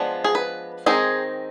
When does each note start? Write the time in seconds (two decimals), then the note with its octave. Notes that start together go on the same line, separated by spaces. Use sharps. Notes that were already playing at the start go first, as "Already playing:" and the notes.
Already playing: F3 G#3 B3 D4
0.24 G#4
0.35 B4
0.86 D#3 G#3 C4 D#4 G#4